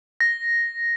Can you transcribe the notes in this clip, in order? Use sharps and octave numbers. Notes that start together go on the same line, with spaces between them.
A#6